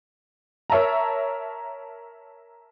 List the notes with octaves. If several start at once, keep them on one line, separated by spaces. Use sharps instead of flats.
A#4 C#5 E5 A5 A#5